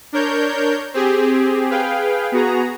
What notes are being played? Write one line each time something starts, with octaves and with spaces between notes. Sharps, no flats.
D4 A#4 C#5 G6
C4 G4 G#4
G#4 B4 F5 G5
B3 F#4 G#4 A#5